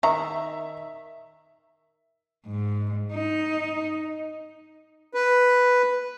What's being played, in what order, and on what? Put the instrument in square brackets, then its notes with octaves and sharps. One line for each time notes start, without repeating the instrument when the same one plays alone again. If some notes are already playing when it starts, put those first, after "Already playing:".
[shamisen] D#3 A#5 [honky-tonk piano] E5
[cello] G#2
D#4
[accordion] B4